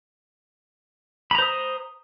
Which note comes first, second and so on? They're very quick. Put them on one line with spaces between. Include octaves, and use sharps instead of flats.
B5 A#5 C5 D#6